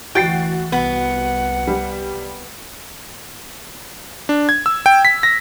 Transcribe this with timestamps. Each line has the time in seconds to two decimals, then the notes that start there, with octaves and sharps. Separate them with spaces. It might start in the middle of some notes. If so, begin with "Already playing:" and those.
0.15 D2 E3 F#4 G5 A6 C7
0.72 C2 B3 F#5
1.67 G3
4.29 D4
4.49 G#6
4.66 E6
4.86 G5
5.05 B6
5.23 A#6